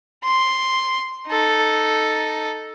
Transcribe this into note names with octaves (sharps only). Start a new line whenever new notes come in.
C6
D#4 A4